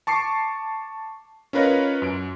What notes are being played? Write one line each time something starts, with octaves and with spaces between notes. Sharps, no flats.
A5 C#6 D6 C7
C#4 F4 A#4 B4 C#5 D#5
F#2 D7